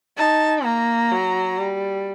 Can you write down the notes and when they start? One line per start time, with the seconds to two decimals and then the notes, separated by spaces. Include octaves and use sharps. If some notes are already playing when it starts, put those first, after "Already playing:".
0.18 D#4 A5
0.64 A#3 A#5
1.11 F#3
1.58 G3